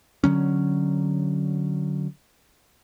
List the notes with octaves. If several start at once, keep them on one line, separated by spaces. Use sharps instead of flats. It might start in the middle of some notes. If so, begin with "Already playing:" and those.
D3 F#3 C#4